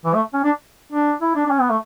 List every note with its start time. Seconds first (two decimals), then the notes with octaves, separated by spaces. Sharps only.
0.05 E3
0.15 A3
0.34 C#4
0.44 D4
0.92 D4
1.21 E4
1.35 D4
1.46 D4
1.50 C#4
1.61 B3
1.70 A3